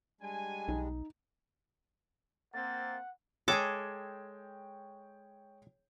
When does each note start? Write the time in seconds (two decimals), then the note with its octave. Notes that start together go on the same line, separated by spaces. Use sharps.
0.21 G3 G#3 D4 G#5
0.68 B1 D#4
2.54 A#3 C4 F#5 A6
3.48 G#3 G#4 A4 C#5 G5 D6